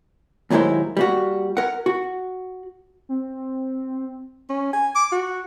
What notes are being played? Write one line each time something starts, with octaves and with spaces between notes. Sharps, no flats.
D#2 A#2 F#3 G#3 E4 C5
G3 A#3 F#4
A#4 F#5
F#4
C4
C#4
G#5
D6
F#4